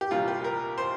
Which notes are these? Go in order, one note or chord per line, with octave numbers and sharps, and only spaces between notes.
G4
C2 A#2 G3 F4
G4
A#4
C5